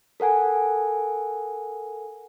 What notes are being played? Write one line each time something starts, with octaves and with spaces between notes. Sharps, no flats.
A4 A#4 F#5 G#5